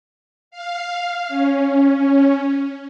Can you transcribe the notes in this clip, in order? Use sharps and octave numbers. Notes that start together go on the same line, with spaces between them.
F5
C#4